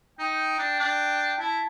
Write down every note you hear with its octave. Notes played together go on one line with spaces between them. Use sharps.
D#4 G5
D4
D4
E4 A5